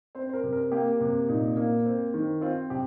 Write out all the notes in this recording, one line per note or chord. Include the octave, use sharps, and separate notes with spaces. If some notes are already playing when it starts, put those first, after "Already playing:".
C4 C5
C5
A#4
C3
A#4
A#3 G4
C3
A#2 D#4
A#3
C4
D#3
C4 F4
C3 G4